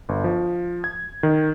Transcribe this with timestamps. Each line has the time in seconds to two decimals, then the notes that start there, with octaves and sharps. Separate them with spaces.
0.09 G1
0.24 F3
0.84 G#6
1.23 D#3